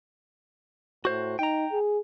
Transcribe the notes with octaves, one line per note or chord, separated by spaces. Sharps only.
A2 F#4 C5
D#4 G5 A#5
G#4